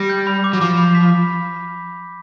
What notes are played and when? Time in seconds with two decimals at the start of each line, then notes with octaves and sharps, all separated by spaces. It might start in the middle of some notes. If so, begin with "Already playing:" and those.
Already playing: G3 A#6
0.09 G6
0.27 B5
0.44 D6
0.53 F#3
0.61 F3 D6
0.78 B5
0.95 B6